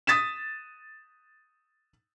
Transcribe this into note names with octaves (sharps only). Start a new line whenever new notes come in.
D#6 A6 B6 E7